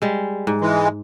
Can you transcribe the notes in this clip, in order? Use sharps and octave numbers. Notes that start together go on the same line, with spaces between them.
G3 G#3
G#2
E3 G#3